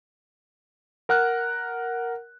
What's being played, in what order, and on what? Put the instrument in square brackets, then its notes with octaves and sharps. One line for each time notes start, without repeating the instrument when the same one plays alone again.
[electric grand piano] A#4 F#5 F6 F#6